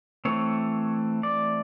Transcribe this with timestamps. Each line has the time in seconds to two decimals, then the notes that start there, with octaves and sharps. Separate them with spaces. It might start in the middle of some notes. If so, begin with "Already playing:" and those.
0.25 E3 A3 C4 C#5
1.23 D5